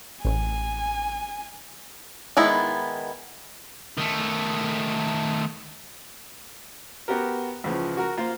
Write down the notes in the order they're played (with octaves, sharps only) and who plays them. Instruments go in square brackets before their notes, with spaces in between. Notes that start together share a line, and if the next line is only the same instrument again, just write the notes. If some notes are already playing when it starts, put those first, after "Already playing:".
[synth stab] A1 [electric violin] G#5
[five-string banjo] D#3 G#3 B3 E4
[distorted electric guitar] D#3 A3
[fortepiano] B3 F#4 G4 A#4
C#2 C#3 E3 F3
F#4 A#4
A#3 F4 C5